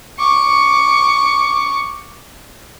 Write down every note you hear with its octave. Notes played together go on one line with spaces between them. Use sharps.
C#6 D6